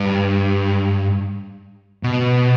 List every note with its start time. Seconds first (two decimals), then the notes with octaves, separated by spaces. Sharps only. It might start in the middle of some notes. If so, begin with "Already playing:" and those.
Already playing: G2
2.03 B2